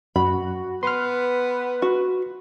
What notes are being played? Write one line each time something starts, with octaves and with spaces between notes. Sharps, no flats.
F#2 F#4 B5
B3 B4 C6 F6
F#4